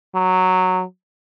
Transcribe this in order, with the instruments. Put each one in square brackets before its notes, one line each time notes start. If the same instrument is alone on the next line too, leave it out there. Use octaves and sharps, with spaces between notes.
[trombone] F#3